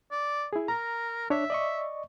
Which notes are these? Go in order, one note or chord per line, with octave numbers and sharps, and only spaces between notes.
D5
E4 G#4
A#4 A#5
D4 C#5 E5
D5 D#5 C#6